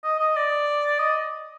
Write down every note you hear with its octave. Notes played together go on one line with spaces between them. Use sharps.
D#5
D#5
D5
D#5